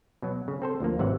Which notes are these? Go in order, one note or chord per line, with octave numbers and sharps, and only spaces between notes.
B2 F#3
C#3
C4 A4 C5
D2 F3 A#3
G#1 C3 E3 F#3 E5 F#5